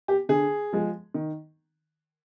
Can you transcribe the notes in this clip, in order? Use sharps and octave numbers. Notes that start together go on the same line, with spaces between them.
G4
D3 G#4
F3 G#3
D#3